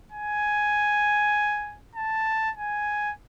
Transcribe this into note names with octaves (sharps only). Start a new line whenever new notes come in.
G#5
A5
G#5